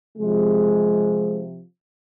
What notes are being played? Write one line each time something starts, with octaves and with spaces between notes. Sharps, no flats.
C3 F3 G#3